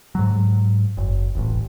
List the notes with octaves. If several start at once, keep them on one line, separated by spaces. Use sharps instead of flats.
G#2 F#3
F#1
D#1 A1